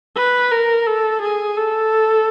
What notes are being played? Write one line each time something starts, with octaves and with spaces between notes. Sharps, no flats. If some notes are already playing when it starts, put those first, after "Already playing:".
B4
A#4
A4
G#4
A4